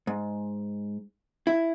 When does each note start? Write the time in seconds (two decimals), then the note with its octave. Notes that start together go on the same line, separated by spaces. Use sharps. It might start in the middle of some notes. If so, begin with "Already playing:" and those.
0.07 G#2
1.47 E4